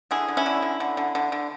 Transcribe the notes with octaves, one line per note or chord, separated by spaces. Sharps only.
D3 E4 G#4
D3
C#4 E4
D3
D3
D3
D3
D3
D3